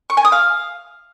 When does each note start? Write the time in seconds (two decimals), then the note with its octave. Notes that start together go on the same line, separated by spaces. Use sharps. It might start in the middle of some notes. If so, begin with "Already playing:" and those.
0.10 C#6
0.17 G#5
0.25 D#6
0.32 F5